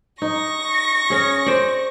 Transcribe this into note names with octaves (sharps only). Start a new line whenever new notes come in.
D#4 C#6 A#6
C#4 G#4
C5 D5